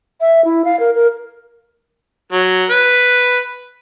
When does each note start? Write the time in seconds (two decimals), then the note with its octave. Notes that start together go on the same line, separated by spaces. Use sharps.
0.21 E5
0.45 E4
0.65 F5
0.80 A#4
0.95 A#4
2.32 F#3
2.70 B4